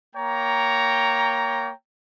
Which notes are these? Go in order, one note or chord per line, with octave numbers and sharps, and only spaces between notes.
A#3 C#5 G5 A#5